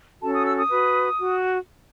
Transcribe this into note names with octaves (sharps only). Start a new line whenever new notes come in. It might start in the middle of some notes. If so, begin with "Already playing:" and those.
C#4 F#4 A4 A5
D#6
E6
D#6
F#4 B4
F#4